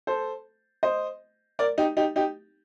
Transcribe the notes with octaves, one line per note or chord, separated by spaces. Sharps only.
A4 C5
C5 D#5
A#4 D5
D#4 G4
D#4 G4
D#4 G4